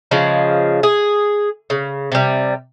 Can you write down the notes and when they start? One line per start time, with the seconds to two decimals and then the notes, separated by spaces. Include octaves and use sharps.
0.11 C#3 F3 G#3
0.83 G#4
1.70 C#3
2.12 C3 G3